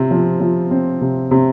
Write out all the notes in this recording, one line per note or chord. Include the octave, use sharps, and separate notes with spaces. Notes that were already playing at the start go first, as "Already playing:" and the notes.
Already playing: C3 C4
F3
F3
C4
C3
C3